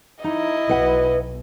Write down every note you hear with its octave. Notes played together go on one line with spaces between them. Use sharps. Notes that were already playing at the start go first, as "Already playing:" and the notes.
D#4 E4 D#5
B1 B4 F#5